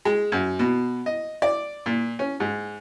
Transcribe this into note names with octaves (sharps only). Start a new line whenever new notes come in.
G#3
F#2
B2
D#5
D5
A#2
C#4
G#2